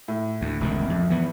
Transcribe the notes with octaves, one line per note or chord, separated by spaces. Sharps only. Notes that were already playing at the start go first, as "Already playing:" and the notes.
A2
D2
E1 C#2 D#3
F2
E3 B3